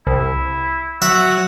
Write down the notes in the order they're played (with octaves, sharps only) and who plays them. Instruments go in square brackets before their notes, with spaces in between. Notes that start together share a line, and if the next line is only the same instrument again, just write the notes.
[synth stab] C2 [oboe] E4
[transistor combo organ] F#3 [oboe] F#4 [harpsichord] E5